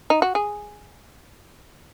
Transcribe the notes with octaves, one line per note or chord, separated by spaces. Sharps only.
D#4
F#4
G#4